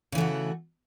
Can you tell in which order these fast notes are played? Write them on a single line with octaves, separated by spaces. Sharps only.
C#3 E3 A3 F#4